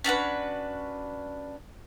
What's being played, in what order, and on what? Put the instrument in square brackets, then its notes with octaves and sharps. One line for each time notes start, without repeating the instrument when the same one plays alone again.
[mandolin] C#4 D4 F#4 B4